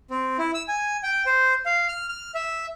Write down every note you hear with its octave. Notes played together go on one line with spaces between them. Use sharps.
C4
E4
E6
G#5
G5
C5
F5
F6
F6
E5